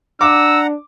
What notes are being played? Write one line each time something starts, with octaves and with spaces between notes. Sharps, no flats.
D4 F#5 A#5 D6 E6